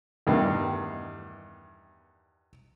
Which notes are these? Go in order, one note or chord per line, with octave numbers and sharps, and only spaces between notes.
E2 G2 D#3